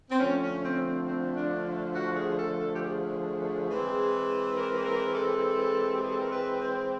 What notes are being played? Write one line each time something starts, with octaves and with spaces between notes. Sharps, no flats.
C4
D3 F3 A3 C#4
C#4
C4
C4
C4
D4
F#4
G#4
A4
A4
G4
G#4
E3 G#3 C4
A#4
A#4
A4
G4
G#4
A4
A#4
B4
C5